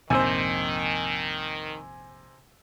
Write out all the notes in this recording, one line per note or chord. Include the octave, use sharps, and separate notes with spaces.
A#1 F2 G#2 C3 D#3 C5 G#5 E6